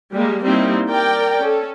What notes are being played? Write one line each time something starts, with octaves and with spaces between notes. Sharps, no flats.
G3 G#3 A#3
G3 A#3 C4 D#4 E4
A#4 D5 G5
C#4 A4